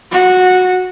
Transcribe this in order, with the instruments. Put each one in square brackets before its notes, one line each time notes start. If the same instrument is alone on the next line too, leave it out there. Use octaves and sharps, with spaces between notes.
[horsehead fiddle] F#4